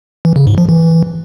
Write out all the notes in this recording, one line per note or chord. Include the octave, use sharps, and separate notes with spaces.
E3
C#3
G#2
F3
E3